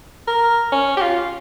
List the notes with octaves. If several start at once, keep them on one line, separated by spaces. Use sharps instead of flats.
A#4
C#4
G4
F4